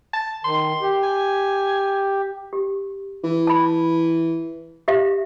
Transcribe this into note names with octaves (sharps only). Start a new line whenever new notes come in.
A5
D#3 C6
G4
G#5
G4
E3
A5 B5
G4 E5 F5